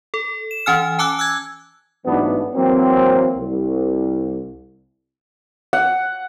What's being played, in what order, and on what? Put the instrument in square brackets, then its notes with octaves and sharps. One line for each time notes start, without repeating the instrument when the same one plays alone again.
[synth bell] A4
E7
E3 C#4 G#5 F6
G#5 A5 D6 E6 F#6
E6 F#6 G#6
[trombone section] A1 G#2 E3 F#3 B3 D4
E3 F#3 A#3 C4
C2
[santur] F#5